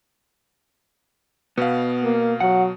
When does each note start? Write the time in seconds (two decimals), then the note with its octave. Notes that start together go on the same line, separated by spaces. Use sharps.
1.58 B2 B3 F5
2.03 A#3
2.40 F#3 F#5